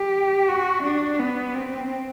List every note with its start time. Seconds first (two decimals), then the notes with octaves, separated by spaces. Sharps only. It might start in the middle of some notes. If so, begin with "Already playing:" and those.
Already playing: G4
0.48 F#4
0.84 D4
1.19 B3
1.55 C4